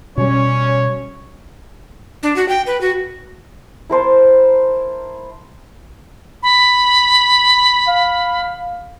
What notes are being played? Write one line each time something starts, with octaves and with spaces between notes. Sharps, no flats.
B2 G3 C#4 C#5
D4
F#4
G5
B4
F#4
E4 A#4 C5 A5
B5
F5